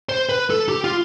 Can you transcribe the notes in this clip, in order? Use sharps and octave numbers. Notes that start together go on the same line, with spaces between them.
C5
B4
A4
G4
F4